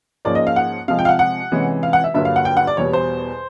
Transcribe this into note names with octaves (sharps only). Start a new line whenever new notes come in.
G#2 F3 A#3 C#4 D5
D#5
F5
F#5
C3 F3 G#3 F5
G5
F5
F#5
F#5
C3 E3 G#3 C#4
F5
F#5
E5
G2 D3 F#3 A#3 E5
F5
F#5
G5
F#5
D5
E2 B2 G3 C#5
C5